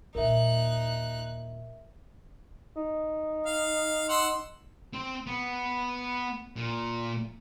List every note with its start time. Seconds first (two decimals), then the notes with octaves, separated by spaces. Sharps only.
0.15 D#2 A#2 D#4 A#4 E5 F#6
2.76 D#4
3.46 F5
4.09 F#5 C6 E6
4.93 C4
5.27 B3
6.56 A#2